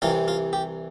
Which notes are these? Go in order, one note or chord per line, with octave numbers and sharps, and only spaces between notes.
C2 C3 E3 F4
F4
G4